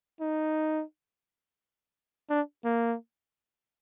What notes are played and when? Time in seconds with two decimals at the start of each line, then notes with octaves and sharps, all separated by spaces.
0.21 D#4
2.30 D4
2.64 A#3